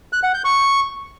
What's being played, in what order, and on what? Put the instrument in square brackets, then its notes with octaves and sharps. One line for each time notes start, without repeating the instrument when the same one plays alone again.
[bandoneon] F#6
F#5
G6
C#6